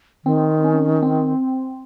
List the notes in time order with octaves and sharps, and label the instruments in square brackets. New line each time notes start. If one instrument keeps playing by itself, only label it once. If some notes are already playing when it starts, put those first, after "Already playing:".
[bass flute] D#3 [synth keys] C4
[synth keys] C#4
C4